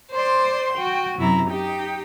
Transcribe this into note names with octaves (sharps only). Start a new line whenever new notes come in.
C5 D5 C6
F#4 G5
F#2 C3 E4 A#5
D#4 G4 G5